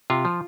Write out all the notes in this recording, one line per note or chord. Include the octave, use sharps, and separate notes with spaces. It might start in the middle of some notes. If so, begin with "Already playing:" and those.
C3 F4
F3